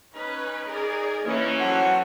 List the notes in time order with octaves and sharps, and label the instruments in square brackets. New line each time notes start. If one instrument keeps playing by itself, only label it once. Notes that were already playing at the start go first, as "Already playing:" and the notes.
[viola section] C#4 B4 [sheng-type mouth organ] D#4
[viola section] G#4 A#4 D5
[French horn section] E3 C#4 [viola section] A#3 E4 C#5
[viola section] F#3 [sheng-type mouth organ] F#4 A4 C5 [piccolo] F#5